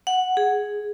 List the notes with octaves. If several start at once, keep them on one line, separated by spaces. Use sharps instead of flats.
F#5
G#4